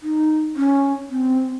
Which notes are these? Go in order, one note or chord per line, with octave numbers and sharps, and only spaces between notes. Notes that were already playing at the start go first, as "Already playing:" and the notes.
D#4
C#4
C4